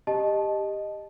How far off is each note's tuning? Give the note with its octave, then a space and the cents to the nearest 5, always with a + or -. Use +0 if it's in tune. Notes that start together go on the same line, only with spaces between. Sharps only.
G4 +15 D#5 -5 A5 -20